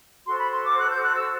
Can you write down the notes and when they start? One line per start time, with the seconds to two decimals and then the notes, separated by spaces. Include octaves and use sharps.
0.25 F#4 A4 C5 C6
0.38 B5
0.51 C6
0.63 D6
0.77 F#6
0.89 G6
1.02 F#6
1.15 E6